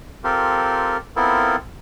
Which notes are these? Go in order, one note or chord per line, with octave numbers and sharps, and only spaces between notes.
C4 F4 G4 A4 A#4
B3 C4 E4 F4 A4 A#4